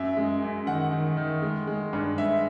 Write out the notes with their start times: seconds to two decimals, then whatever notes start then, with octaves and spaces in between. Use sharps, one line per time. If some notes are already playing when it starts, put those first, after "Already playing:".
Already playing: F#2 E5
0.17 G#3
0.42 F#2
0.67 D#3 F#5
0.92 D#3
1.17 D#3
1.42 G#3
1.67 G#3
1.93 G2
2.18 G#3 E5